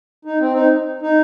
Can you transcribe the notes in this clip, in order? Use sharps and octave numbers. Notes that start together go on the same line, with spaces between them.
D#4
C4
D#4
D#4